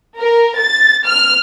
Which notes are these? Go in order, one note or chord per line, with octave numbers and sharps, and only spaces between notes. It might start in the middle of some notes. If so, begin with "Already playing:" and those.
A#4
A6
F6